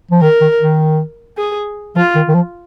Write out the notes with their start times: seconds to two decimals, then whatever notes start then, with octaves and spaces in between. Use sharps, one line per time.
0.11 F3
0.21 D#3 A#4
0.41 D#3
0.60 D#3
1.37 G#4
1.96 F3 F4
2.15 D#3
2.29 D#3
2.35 F3